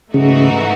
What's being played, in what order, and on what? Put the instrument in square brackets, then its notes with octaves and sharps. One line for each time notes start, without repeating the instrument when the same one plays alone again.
[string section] G#2 E3 A3 D#4 F#4 [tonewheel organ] C#3